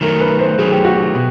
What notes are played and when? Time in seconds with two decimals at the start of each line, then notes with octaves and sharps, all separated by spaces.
0.01 D#3 F#3 A3 A#4
0.21 B4
0.39 C5
0.58 D#3 F#3 A3 G#4
0.71 G4
0.85 F#4
0.97 G4
1.15 B2